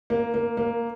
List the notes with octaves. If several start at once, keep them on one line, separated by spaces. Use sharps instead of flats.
A#3
A#3
A#3